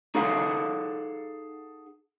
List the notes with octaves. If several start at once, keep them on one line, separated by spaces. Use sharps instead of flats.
D#4 G#4 A4 F5 F#5